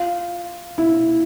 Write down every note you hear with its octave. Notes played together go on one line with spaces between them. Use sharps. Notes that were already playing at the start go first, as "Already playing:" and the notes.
Already playing: F4
E4